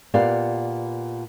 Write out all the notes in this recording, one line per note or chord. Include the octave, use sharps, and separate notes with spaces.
A#2 B3 G4 D5 F5